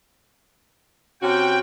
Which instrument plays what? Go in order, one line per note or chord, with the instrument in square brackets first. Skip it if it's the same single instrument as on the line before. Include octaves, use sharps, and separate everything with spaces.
[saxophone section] C3 C#4 F#4 [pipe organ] G5